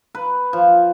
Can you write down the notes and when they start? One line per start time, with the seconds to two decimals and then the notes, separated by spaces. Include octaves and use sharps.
0.15 B4
0.53 F3